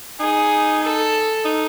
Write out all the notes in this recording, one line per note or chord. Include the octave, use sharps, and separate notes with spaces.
D#4 G#4
A4
D#4